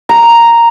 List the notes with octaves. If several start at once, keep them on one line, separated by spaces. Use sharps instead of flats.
A#5